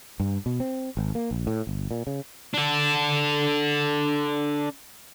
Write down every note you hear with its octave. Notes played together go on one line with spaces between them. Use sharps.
G2
B2
C4
G#1
A#3
A#1
A2
G1
A#2
C#3
D4 A4